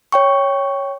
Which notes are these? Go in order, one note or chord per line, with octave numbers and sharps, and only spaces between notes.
C#5 G5 C#6